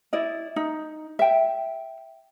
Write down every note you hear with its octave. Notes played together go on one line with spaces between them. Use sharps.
E4 D5 D#5
D#4
E5 G5